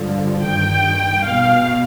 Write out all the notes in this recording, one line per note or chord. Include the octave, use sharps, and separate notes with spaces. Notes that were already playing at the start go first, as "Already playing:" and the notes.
Already playing: G2 D3 F3
G2 D#3 G5
B2 F5